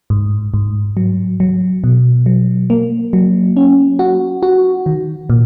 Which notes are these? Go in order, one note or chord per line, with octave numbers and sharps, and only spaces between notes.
G#2
G#2
F#3
F#3
B2
F#3
A#3
F#3
C#4
F#4
F#4
D#3
A#2